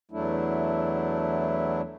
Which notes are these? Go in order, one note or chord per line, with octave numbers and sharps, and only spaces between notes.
E2 F#3 A3 D4 E4